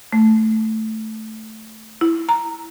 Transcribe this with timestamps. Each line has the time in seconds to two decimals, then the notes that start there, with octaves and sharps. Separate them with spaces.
0.13 A3
2.01 E4
2.29 A#5